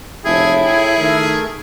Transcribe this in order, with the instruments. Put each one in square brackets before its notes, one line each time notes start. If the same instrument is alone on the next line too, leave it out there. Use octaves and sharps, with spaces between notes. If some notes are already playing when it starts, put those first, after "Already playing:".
[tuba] F1 [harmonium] A2 A4 G5 [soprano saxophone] E4 [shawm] G#4
[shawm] G#4
[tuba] D#3 [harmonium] A3 A#4 E5